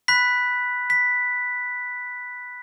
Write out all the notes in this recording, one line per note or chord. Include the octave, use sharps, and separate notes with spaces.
B5 F#6 B6
B6